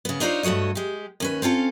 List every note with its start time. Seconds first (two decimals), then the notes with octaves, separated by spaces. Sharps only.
0.05 C#3 B3
0.20 D4 D#4 F4 G#4 C5 C#5
0.43 G2 A3 F#4 C#5 D#5
0.75 G#3 G4
1.20 D#2 C#4 B4
1.42 C4 C#4 F4 A4